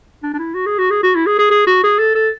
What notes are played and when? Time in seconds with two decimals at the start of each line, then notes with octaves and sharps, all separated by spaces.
0.23 D4
0.33 D4
0.38 E4
0.54 F#4
0.66 G#4
0.78 F#4
0.90 G#4
1.03 F#4
1.15 E4
1.26 G#4
1.38 G#4
1.51 G#4
1.67 F#4
1.83 G#4
1.99 A4
2.15 A4